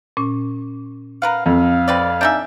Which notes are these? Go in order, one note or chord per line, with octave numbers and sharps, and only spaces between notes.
A#2 C#4
A#4 B4 F5 F#5
F2 F5
C4 B4 D5
D4 D#4 E5 G#5 G6